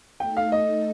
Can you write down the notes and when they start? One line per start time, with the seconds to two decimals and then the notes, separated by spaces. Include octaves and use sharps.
0.20 A3 D#4 A4 G5
0.37 F5
0.52 D#5